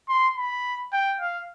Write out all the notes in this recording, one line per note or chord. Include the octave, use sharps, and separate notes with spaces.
C6
B5
G5
F5